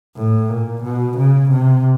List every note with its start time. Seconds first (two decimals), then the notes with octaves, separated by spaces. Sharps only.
0.16 A2
0.49 A#2
0.84 B2
1.17 C#3
1.51 C3